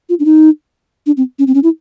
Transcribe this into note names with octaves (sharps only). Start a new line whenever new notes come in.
F4
D4
D#4
D4
C4
C#4
C4
C#4
E4